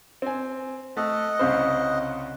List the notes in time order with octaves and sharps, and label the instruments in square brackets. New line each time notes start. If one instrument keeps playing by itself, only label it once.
[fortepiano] C4 G#5
[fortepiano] A3 [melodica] D#5 F#5
[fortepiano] C2 C#3 C5